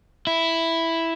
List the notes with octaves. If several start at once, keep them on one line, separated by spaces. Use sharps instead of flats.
E4